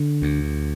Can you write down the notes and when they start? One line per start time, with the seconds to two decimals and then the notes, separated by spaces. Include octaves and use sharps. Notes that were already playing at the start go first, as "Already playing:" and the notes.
Already playing: D3
0.22 D2